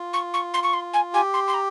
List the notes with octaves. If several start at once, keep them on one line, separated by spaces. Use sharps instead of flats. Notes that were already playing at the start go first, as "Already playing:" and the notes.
Already playing: F4
C#6
C#6
C6
C#6
C6
G#5
G4 G#5
C6
C6
A#5